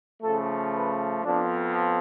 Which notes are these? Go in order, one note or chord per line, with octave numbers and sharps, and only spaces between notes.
C#3 F3 A3 A4
B4
F2 F3 B3 D4